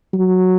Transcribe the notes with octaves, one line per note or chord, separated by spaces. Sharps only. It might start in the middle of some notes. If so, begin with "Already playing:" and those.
F#3